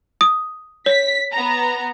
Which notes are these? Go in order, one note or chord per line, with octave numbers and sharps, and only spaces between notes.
D#6
C#5 B6
B3 A#5